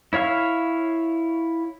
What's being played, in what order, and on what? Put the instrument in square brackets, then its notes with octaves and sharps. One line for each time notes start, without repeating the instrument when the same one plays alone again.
[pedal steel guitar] E4 C#5 F5 C#6